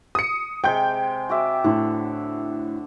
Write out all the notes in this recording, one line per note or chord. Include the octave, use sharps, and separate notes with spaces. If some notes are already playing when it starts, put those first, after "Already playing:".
D#6 C#7
C3 G#3 G5 G6
F#4 D5 E5
A2 D3